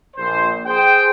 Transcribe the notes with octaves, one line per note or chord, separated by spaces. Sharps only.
A#1 C5
G#4 C5 G5